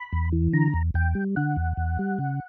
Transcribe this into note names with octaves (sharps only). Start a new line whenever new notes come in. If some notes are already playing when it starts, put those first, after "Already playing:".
Already playing: B5
E2
E3
D3 A#5
E2
E2 G5
G3
D3 F#5
E2
E2
G3
C#3